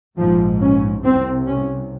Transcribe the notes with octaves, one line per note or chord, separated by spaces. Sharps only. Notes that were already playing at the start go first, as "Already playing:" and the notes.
A#1 G#2 F3
C#4
C2 C3 C4
C#4